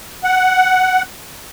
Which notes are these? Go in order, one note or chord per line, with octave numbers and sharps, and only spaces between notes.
F#5